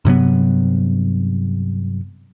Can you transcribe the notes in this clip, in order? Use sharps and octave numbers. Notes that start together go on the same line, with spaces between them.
G2 C3 F#3 B3